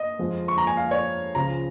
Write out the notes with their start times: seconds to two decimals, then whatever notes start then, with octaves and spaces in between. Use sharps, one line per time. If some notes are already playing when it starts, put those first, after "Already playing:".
Already playing: D#5
0.19 F2 F3 G#3
0.48 C#6
0.58 A#5
0.67 G#5
0.77 F5
0.91 C#5
1.35 C#2 C#3 F3 A#5